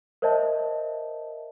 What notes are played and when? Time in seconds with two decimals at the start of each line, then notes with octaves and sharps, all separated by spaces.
0.22 A#4 C5 C#5 D#5 E5 A5